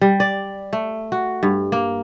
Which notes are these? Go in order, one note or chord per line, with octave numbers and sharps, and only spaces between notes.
G3
D5
A3
F#4
G2
A#3